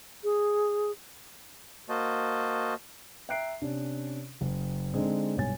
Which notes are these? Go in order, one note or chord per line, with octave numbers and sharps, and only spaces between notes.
G#4
A#3 F#4 C5 D#5 A5
E5 G5 A#5 F#6 C7 D7
C3 C#4 D4
F#1
D3 G#3 C4 D4 D#4
B1 G2 C#5 G#5 A6